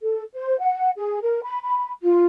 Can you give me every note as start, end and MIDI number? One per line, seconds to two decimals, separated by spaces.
0.01 0.24 69
0.33 0.57 72
0.59 0.90 78
0.96 1.20 68
1.22 1.40 70
1.43 1.62 83
1.62 1.90 83
2.03 2.26 65